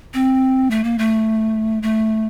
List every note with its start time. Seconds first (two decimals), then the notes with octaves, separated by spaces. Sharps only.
0.14 C4
0.71 A3
0.84 A#3
0.98 A3
1.83 A3